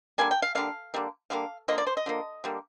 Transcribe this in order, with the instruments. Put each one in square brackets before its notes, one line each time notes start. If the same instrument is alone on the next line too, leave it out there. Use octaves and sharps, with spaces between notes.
[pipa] D3 G3 A#3 G#5
G5
F5
D3 G3 A#3 F5
D3 G3 A#3
D3 G3 A#3 F5
D3 F3 A#3 D#5
D5
C5
D#5
D3 F3 A#3
D3 G3 A#3